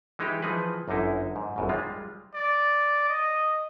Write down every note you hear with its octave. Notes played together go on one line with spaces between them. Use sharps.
E3 G#3 D#4 E4 G4
E3 F3 D#4 G#4 B4
G1 F#2 D3 D#4 E4
G#2
G#1 F#2 B2
G3 G#3 F4
D5
D#5